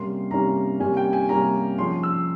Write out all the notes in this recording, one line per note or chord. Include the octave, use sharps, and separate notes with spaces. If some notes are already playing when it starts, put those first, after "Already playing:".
Already playing: C3 G3 A#3 C#4 C6
C3 G3 A#3 C#4 A#5
C3 G3 A#3 C#4 G#5
G5
G#5
C3 G3 A#3 C#4 A#5
F3 G#3 C#4 C6
E6